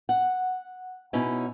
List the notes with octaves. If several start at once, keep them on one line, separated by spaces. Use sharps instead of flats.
F#5
B2 C#4 D#4 E4